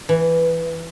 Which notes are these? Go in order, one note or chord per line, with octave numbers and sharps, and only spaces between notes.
E3